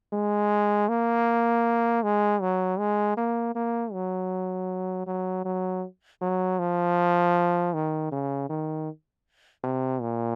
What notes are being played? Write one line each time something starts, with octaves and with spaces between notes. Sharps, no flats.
G#3
A#3
G#3
F#3
G#3
A#3
A#3
F#3
F#3
F#3
F#3
F3
D#3
C#3
D#3
C3
A#2